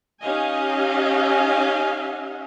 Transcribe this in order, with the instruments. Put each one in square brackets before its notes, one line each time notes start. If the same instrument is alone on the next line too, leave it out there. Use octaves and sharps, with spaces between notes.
[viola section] C#4 D#4 G4 D#5 F5 G#5